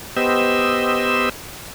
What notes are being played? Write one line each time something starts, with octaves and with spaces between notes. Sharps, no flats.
B3 G4 C5 D#5 E6